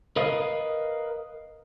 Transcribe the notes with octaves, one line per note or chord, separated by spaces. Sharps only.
A#4 B4 D#5 F5